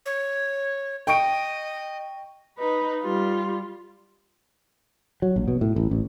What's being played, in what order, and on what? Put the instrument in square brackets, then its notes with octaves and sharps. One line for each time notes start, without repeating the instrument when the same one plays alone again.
[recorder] C#5
[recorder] D#5 [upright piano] G5 C#6 D7
[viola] D#4 B4
G3 F4
[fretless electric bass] F#3
A#1
B2
A2
A1
A1